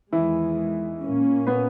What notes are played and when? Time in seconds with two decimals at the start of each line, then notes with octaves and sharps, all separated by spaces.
0.13 E2 D#3 E3 G#3 E4
1.02 A#2 A#3 C#4
1.47 B3 B4